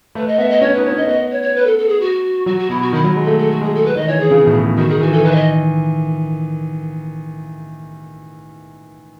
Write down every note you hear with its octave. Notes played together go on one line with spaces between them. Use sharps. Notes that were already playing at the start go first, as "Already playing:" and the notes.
A3 B4
D#5
B3 E5
D#5
C#4 C#5
D#4 B4
C#5
C#4
D#5
B3 D#5
C#5
C#5
B4
A4
A4
G#4
F#4
F#3 F#4
F#4
B2 E4
F#4
D#3 E4
F#3
G#3
A3 A4
A4
F#4
G#3 G#4
A4
B4
D#3 D#5
E3 C#5
G#4
C#3
B2
A2
B2
D#3 F#4
D#3 G#4
E3 F#4
E3 A4
D#3 B4
E5
D#5